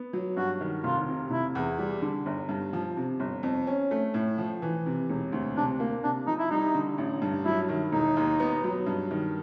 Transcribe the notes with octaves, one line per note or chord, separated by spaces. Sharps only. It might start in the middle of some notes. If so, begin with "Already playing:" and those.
Already playing: B3
F#3
G2 F#4
D#3
F1 F4
C3
F1 E4
E2
G3
D3
G1
G2
F3
C3
G1
F2
C#4
A3
A2
F3
E3
C3
E1
D2
C3 D4
A#3
C3 D4
F3 D#4
E4
G3 D#4
D3
A1
G2
F#3 E4
D#3
E1 D#4
D#2
B3
F#3
G2
D#3